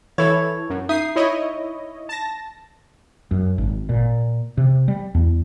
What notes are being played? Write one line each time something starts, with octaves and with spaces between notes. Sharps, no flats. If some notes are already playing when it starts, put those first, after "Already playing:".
E3 E4 A4 C#5 C#6 G#6
F#2
D#4 E5 D#6 C7
E4 C#5 D#5
A5 A#6
F#2
G#1
A#2
C3
G3
E2